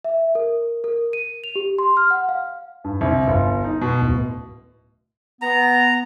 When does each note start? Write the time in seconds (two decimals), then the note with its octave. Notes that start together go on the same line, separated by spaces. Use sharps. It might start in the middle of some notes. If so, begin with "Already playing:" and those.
0.05 E5
0.35 A#4
0.84 A#4
1.13 D#7
1.44 F7
1.56 G4
1.79 C6
1.97 F6
2.10 F#5
2.29 F5
2.84 G2
3.01 C2
3.27 G1
3.64 D#4
3.81 B2
4.01 D1
5.42 B3 A#5